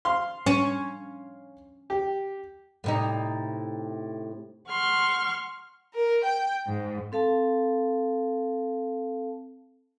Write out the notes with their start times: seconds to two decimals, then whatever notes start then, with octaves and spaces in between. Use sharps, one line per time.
0.05 F5 C6
0.46 C#4
1.90 G4
2.84 A2 C3 D#4
4.68 F#5 C6 C#6 F6
5.93 A#4
6.23 G5
6.65 G#2
7.12 C4 A4 F5 A5